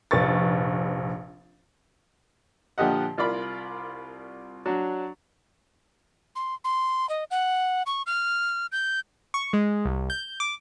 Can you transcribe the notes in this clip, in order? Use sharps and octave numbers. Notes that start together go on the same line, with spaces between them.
F1 A#1 B4 C#6 A6
A#2 D3 F3 G4 D#5 F#5
C2 F4 A#4 D5 B5
F#3 D4 F#4
C6
C6
D#5
F#5
C#6
F6
G6
C#6
G#3
C2
G6
D6